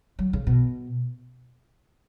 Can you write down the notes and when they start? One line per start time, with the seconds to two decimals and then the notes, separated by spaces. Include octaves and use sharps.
0.19 F#3
0.33 C#3
0.47 B2